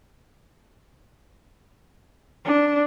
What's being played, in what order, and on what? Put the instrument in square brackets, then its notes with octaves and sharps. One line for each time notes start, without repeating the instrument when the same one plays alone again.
[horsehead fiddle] D4